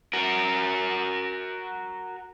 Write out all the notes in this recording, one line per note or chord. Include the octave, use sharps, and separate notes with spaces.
F#4 A#4